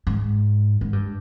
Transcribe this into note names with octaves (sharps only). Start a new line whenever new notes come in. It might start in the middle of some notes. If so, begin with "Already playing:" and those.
G#2
G#2
G2